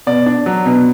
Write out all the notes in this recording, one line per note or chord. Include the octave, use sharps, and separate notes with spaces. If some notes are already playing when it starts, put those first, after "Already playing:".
B2 D5
D4
F#3
B2